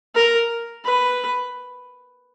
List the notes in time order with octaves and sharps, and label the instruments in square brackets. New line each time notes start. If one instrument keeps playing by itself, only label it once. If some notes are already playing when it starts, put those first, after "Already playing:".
[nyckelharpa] A#4
B4